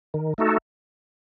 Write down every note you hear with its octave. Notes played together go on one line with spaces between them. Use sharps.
D#3
A3 D#4 F#4 A4